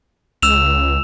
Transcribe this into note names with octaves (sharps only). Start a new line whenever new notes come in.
C#2 E6 E7 F7